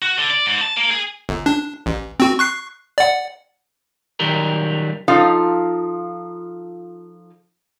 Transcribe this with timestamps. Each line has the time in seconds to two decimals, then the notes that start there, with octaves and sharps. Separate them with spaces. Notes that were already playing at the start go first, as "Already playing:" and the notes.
0.02 F#4
0.18 D3
0.30 D5
0.46 G#2
0.61 A5
0.77 A#3
0.91 G#4
1.29 G1
1.46 D4
1.86 A1
2.20 C4 F#4
2.39 C#6 F#6 C7
2.98 D5 F#5
4.20 D#3 F#3 G3 A#4
5.08 F3 D#4 F4 A4 F5